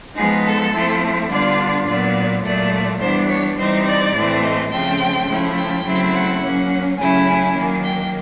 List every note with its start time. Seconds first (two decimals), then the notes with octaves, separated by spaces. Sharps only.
0.15 F3 G#3 B3 D#4 G#4
0.45 A4
0.72 F3 A3 C4 E4
1.29 D3 G3 B3 D4 F4 D5
1.86 A#2 F#3 B3 D5
2.43 A#2 F#3 A3 D5
2.99 E3 G3 B3 D4 C5
3.28 C#5
3.57 E3 G3 C4 D#4 C5
3.85 D5
4.13 A2 E3 A3 C4
4.41 D#5
4.70 C#3 F3 A3 C4 G5
5.26 F3 A3 C#4 E4
5.56 G5
5.83 C#3 F#3 A3 C4 E4
6.12 F#5
6.40 F#3 A#3 C#4
6.97 C#3 F#3 A3 C#4 E4 G#5
7.26 G#5
7.54 D#3 F#3 A#3
7.83 G5